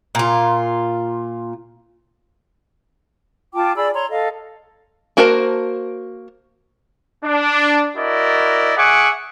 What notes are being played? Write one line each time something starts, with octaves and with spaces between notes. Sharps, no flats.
A#2 F4
F4 G5 A5 D6
G#4 D5 B5 E6
C#5 A#5 C6
A4 D#5 F5
A#3 F#4 A#4 C5 A5
D4
E4 F#4 A#4 D5 D#5
G#4 E5 F#5 C#6 D6